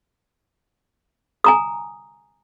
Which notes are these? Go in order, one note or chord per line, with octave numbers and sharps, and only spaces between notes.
G#5 A#5 D#6